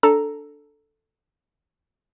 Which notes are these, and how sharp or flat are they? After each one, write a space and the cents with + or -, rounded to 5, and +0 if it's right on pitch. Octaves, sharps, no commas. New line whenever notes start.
D4 +0 A4 +5 A#5 +0